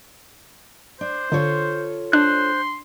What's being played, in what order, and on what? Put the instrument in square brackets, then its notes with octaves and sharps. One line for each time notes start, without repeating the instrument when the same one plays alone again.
[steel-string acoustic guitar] D4 [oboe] C5
[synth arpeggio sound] D3 [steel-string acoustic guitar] F4 A4 C#5
[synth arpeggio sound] D4 [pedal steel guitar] C5 F#6 [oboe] C6